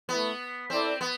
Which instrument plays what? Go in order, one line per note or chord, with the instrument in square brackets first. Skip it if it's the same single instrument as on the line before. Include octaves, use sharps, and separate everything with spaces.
[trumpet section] A3 E4 B4 [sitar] B3
[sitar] C4 [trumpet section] E4 A4 D5
[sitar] B3